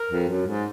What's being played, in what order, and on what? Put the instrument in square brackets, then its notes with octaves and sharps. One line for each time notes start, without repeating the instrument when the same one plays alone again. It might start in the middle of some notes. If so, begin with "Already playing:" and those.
Already playing: [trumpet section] A#4
[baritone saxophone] F2
F#2
G#2